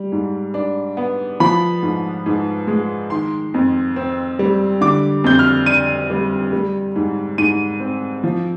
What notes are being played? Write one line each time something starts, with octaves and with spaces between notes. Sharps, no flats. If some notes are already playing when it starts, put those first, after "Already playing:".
Already playing: G3
G#2
D4
B3
F3 B5
G#2
G#2
G#3
D#3 C6
F2
C4
G3
D3 D6
F2 G6
F6
D4 D#7
G3
G3
G#2
G#2 D#7
C4
F3